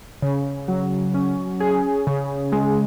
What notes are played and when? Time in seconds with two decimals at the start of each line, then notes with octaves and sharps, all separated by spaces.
0.22 C#3
0.68 F#3
1.14 C#4
1.60 G#4
2.07 C#3
2.52 G#3